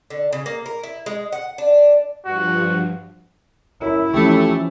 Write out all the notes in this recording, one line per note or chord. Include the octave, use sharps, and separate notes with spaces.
D3
C#3
A#3
A#4
E4
G#3
F#5
D4
G2 F3 F#4
F#2 E4
E3 F3 A3 C#4 G4